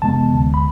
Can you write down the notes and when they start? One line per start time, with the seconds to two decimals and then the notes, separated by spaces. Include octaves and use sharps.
0.02 F2 C3 E3 G#3 B3 A5
0.33 D2 D3 G#3
0.54 B5